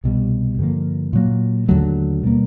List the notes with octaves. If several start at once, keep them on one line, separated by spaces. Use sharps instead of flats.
C2 B2 G3
G2 D3 F3 A#3
A#2 F#3 A#3
D#2 D3 F#3 A3
B2 G3 A#3